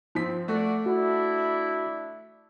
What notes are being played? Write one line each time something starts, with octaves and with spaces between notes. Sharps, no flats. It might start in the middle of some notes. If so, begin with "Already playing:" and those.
F3 C4 B6
A3 F#4 D5
D4 E4 F#4